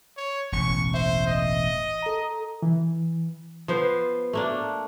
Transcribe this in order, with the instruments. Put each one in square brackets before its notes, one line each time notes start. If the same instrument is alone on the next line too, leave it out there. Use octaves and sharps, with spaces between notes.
[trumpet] C#5
[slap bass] E1 A1 [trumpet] C#6
[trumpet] C5 [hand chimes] E5
[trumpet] D#5
[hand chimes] A4 A#5
[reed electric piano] E3
[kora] F3 B3 C5
A3 A#3 D4